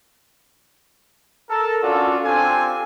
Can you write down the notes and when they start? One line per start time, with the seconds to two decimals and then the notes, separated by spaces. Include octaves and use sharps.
1.49 A4 A#4 A5
1.83 C#4 D4 F4 F#4 A4 D5
2.24 C4 D4 F4 G4 A4 G#5